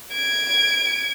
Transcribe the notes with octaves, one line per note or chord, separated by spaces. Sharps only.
G#6 D7